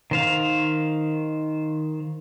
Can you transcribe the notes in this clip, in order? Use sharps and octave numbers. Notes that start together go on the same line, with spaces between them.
D#3 C5 F5